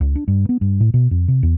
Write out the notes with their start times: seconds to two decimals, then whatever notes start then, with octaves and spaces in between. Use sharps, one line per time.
0.01 C#2
0.15 D4
0.28 G2
0.49 B3
0.61 G2
0.80 A2
0.94 B2
1.11 F2
1.28 C3
1.43 E2